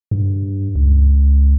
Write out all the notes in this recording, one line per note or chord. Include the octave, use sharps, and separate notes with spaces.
G2
C#2